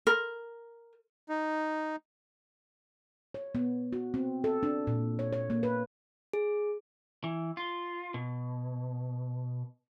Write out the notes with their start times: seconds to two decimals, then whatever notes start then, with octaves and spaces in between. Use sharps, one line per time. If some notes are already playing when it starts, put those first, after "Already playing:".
0.07 A#4
1.29 D#4
3.34 C#5
3.55 B3
3.93 F#4
4.14 C4
4.44 A4
4.63 D4
4.87 A#2
5.19 C#5
5.33 C#5
5.50 A#3
5.63 B4
6.33 G#4
7.24 E3
7.57 F4
8.14 B2